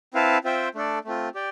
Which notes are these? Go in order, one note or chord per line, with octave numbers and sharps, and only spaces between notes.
C4 E4 B4 F5 A5
C4 F4 C5 E5 G5
A3 D4 A4 D5
A3 C4 F4
G4 D5 G5